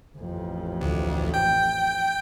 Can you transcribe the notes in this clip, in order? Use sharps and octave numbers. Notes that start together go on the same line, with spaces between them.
A1 F2
D2
G5